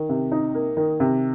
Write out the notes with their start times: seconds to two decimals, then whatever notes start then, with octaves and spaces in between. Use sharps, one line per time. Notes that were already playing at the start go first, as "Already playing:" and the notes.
Already playing: D#3
0.09 C3
0.32 D#4
0.54 A#3
0.77 D#3
1.00 C3